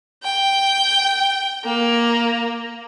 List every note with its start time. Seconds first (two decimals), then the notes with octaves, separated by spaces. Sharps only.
0.23 G5
1.65 A#3